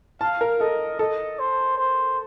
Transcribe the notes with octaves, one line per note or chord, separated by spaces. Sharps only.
F5 A5
A#4
A4 D#5
A4 D#5
C5
C5